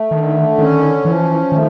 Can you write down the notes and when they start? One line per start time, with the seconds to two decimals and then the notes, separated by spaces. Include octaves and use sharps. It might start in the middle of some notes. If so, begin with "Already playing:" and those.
Already playing: A3
0.11 D3 D#3
0.58 D#3 C#4
1.05 E3 F3
1.52 D#3 A3